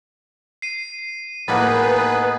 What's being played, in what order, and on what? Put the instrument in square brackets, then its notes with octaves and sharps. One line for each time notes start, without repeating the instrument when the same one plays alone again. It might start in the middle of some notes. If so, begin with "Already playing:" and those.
[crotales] C7 D#7
[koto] A2 A#3 F#4 [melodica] B3 D#4 G#4 [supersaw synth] B4 [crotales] A6